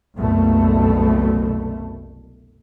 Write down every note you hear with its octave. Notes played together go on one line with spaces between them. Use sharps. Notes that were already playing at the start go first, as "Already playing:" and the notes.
F#1 C2 B2 A3